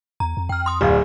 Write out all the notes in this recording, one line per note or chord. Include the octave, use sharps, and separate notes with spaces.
E2 A#5
F2
F2 G5 F6
C6 D#6
D1 D5 F5